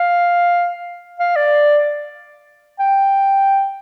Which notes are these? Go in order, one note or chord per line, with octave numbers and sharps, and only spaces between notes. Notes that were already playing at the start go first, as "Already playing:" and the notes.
Already playing: F5
F5
D5
G5